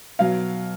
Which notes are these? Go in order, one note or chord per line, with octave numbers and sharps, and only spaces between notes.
B2 F#3 F5